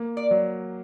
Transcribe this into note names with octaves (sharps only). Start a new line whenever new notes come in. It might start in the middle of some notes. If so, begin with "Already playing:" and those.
Already playing: A#3
D5
F#3